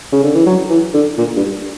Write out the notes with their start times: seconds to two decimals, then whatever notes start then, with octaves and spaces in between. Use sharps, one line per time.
0.12 C#3
0.23 D3
0.35 E3
0.46 F#3
0.70 E3
0.94 D3
1.18 A#2
1.37 G2